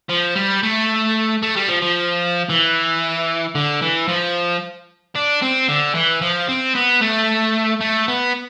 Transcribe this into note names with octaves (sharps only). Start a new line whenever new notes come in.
F3
G3
A3
A3
G3
F3
F3
E3
D3
E3
F3
D4
C4
D3
E3
F3
C4
B3
A3
A3
B3